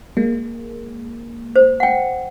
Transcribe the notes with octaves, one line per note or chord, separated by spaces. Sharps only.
G#3 A#3
C5
F#5 G5